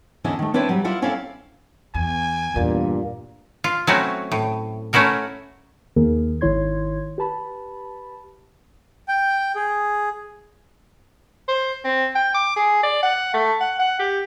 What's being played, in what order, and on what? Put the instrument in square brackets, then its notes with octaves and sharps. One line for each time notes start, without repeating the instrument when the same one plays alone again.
[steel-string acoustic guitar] E2 D3 C#4 D4 E4 D#5
D#3 A3
C4 D4 E4 B4 C#5 E5
F#3 G3
E4 F4 D5 F#5
C4 C#4 E4 A4 D5 F5
[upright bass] E2 [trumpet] G#5
[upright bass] E2 [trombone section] G2 A#2
[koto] F4
F#3 A3 C4 C#4 E4 F#4
A2
A3 C#4 E4 F#4 A#4
[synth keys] D#2 D#3 A#3 G#4 A#4
G#1 D#3 E4 C#5 C6 G#6
G4 B4 A5 B5
[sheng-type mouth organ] G5
G#4
[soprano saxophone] C5
C4
G5
D6
G#4
D5
F#5
A3
F#5
F#5
G4